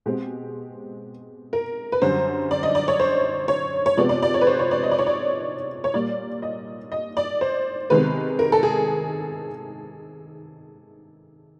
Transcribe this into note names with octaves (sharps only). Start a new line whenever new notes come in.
B2 G#3 C4 G4
A#4
B4
F#2 D3 G3 C5
D5
D#5
D5
C#5
C5
C#5
C#5
C3 F3 G#3 B3 D5
D5
D5
C#5
B4
C5
C#5
D5
D#5
D5
C#5
D5
C#5
A#2 G3 A#3 D5
D#5
D#5
D5
C5
C3 D#3 G#3 B3 B4
A#4
A4
G#4